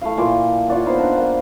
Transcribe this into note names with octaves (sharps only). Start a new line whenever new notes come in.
A3 E4 F5
A#2 E3 C6 D6
F4 C#5 D5 F#5
B3 D#4 C5
D4
A#3